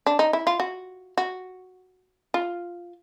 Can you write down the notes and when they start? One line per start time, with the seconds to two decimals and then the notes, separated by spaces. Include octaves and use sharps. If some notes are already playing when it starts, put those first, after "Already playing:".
0.06 D4
0.19 D#4
0.33 E4
0.47 F4
0.60 F#4
1.18 F#4
2.34 F4